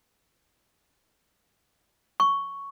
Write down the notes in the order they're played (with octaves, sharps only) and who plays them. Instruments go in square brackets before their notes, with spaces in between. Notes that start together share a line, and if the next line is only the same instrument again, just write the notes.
[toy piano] C#6